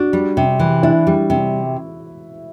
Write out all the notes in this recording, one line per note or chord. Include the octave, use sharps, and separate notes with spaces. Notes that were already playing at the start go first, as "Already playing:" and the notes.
Already playing: D4 F#4
G3
C3
E3
D4 E4
G3
C3